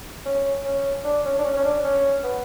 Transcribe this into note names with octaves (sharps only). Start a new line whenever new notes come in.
C#4
C#4
D4
C#4
D4
C#4
C#4
D4
C#4
B3